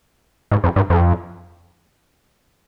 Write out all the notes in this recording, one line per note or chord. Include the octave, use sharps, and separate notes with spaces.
G#2
F2
G2
F2